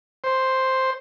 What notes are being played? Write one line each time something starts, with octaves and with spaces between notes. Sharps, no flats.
C5